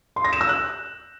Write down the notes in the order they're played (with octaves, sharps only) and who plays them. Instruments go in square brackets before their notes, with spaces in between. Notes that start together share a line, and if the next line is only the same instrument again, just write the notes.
[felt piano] C6
A#6
E7
E6
F#6